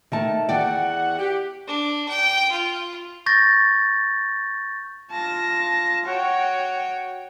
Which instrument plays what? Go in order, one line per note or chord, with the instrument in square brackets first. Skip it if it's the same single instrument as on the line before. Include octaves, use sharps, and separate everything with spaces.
[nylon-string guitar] D#3 A3 A5
[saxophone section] E2 F#4 F#5 [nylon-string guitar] D5 G5
[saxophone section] G4
[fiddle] D4
G5
F4
[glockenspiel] C#6 G6 A6 A#6
[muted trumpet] F4 [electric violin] A5 A#6
[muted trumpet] F#4 [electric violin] C#5 G5